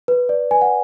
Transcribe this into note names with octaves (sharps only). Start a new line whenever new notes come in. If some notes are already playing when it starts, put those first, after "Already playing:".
B4
D5
B4 G#5
F#5